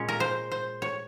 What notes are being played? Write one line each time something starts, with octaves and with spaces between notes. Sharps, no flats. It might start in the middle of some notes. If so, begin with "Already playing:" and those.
Already playing: A#2 G#3 C#4 C#5
A#4
C5
C5
C#5